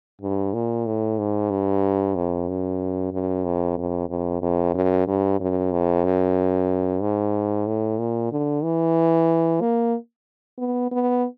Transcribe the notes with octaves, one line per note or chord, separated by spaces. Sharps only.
G2
A#2
A2
G#2
G2
F2
F#2
F#2
F2
F2
F2
F2
F#2
G2
F#2
F2
F#2
G#2
A2
A#2
D3
E3
A#3
B3
B3